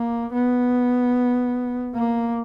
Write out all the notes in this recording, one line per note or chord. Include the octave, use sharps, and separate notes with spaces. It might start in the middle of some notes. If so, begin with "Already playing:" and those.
Already playing: A#3
B3
A#3